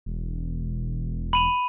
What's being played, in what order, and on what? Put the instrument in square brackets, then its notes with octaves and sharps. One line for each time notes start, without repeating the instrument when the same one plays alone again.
[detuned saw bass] E1
[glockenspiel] B5 D#7 F7